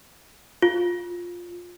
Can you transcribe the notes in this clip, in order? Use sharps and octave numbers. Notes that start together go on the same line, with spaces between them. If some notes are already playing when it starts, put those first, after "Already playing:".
F4